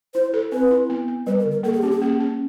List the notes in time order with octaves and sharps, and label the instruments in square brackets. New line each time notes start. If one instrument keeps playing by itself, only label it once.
[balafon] E4 [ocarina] C5
[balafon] A4
[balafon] C4 [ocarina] B4
[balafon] E4
B3
B3
[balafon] G3 [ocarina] B4
[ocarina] A#4
[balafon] D3
[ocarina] A#4
[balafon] A#3 [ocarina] A4
[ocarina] G#4
[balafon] C#4 [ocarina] G4
[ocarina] G#4
[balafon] A#3
C#4